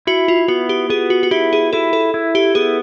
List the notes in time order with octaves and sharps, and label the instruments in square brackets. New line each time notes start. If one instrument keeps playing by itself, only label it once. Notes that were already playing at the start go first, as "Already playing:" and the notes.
[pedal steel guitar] E4 [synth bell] F#4
[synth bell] F4
[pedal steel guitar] B3 [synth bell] F#4
[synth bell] G4
[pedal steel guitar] B3 [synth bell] G#4
[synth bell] F#4
F#4
[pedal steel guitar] E4 [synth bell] G4
[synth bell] G#4
[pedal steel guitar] E4 [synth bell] A4
[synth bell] A4
[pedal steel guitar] E4
[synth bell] G4
[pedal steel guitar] B3 [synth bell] G#4